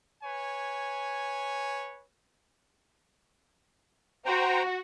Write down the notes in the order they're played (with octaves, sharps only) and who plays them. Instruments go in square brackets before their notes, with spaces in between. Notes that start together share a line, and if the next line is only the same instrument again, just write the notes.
[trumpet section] B4 C#5 G#5
[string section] F#4 [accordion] C5 G5 A#5